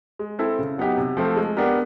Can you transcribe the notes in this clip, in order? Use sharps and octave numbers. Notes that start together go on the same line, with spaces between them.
G#3
C4 E4 A4
C#3
F#3 B3 D#4 G4
C3
F3 A3 C4 F4
G#3
B3 D4 G4 A#4